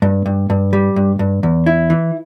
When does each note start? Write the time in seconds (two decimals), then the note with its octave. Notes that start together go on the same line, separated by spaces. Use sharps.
0.02 G2
0.26 G2
0.50 G2
0.73 G3
0.96 G2
1.19 G2
1.43 E2
1.66 E4
1.90 E3